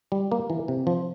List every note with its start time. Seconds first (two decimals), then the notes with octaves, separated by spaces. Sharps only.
0.12 G3
0.32 A#3
0.50 E3
0.68 C3
0.87 F3